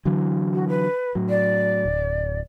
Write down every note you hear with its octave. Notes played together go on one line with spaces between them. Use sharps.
D3 E3 F#3
F#4
B4
A2 F#3
D5
D1